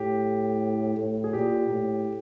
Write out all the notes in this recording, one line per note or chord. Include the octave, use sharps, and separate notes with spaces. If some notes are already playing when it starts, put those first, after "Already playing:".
Already playing: A2 G4
A2
G#4
A#2 G4
A2